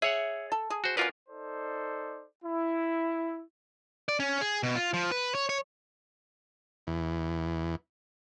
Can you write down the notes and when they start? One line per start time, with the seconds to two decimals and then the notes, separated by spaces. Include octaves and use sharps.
0.02 G#4 C#5 E5 F#5
0.52 A4
0.70 G#4
0.84 F#4 C5
0.97 C#4 F4 F#4 A#4 B4 D5
1.29 D#4 A4 C5 D5
2.44 E4
4.09 D5
4.20 C#4
4.41 G#4
4.63 B2
4.76 F4
4.94 F3
5.11 B4
5.35 C#5
5.49 C#5
6.87 E2